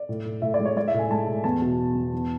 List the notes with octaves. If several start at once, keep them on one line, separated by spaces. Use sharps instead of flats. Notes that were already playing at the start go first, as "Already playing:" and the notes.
Already playing: D5
A2
A2
A2 E5
D5
G#3
C#5
G#3 D5
E5
A2
G#5
G#3 A5
A2
E2 A5
B2
B2
E2
E2